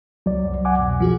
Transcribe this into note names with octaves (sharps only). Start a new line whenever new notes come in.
C#2 F#3 D5
C2 F#2
F#5 G#5 D6
F2 B2
F3 F#4 G#4